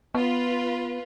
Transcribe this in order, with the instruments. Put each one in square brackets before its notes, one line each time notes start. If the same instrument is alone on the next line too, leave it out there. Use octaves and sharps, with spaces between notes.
[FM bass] B3 [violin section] F4 B4